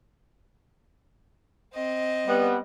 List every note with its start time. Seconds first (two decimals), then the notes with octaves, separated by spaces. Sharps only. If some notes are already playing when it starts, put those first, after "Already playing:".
1.74 C4 D#5
2.27 G3 B3